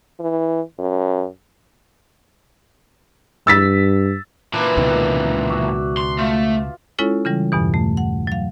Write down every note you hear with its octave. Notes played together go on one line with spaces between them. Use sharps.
E3
F#2
G2 E6 A6 B6
A#2 E3 D4 B4
C#2 B2 D#3
F#4 D5 E5
C6
A3 F4
G#3 C#4 E4 F4 A4 C#5
C#3 E3 G3
E2 G2 B2 E3
A3
F#5
F#3 F5